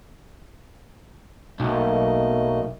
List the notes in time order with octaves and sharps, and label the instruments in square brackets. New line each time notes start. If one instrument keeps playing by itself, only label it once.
[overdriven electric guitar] B1 [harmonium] A3 A#3 D#5